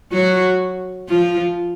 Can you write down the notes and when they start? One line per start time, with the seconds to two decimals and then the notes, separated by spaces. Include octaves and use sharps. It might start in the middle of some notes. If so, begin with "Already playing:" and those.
0.12 F#3 F#4
1.09 F3 F4